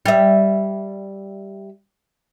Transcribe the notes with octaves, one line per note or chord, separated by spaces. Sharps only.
G3 E5